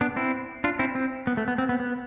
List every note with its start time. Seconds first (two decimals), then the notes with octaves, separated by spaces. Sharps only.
0.01 B3 D4
0.16 C4 E4
0.64 D4 F4
0.79 C4 E4
0.95 C4
1.27 B3
1.37 A3
1.48 B3
1.58 C4
1.69 B3
1.80 B3